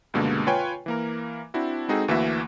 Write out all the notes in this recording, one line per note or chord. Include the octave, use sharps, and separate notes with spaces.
C#2 G2 B2 D3 G#3 A#3
F4 B4 C#5 G5 G#5
E3 A#3 A#4
C4 D4 E4 F#4
G#3 C4 D#4 F#4 G#4 A4
D2 E3 A#3 D4 F#4 E5